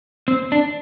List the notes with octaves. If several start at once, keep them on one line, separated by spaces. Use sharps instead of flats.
C4
D4